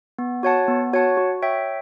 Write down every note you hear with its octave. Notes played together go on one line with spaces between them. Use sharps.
B3
F#4 C#5 F#5 A5
B3
F#4 C#5 F#5 A5
F#4
C#5 E5 G5